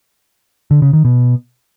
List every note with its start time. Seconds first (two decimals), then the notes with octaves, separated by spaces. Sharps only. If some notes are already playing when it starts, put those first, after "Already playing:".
0.71 D3
0.82 C#3
0.93 D#3
1.05 B2